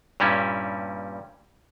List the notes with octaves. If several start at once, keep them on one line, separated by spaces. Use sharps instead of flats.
G2 A#2 G3 C#4 E4